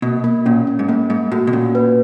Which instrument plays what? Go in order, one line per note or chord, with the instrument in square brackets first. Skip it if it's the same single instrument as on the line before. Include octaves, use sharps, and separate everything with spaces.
[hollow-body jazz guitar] B2 [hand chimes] A#3
[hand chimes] A#3
[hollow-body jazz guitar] A#2 [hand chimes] C#4
[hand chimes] C#4
[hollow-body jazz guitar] G#2
[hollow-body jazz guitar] A2 [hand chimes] A#3
[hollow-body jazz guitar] G#2 [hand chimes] A#3
[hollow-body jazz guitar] A2 [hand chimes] F#4
[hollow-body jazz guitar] B2
[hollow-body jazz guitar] A#2 [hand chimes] C#4
[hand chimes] B4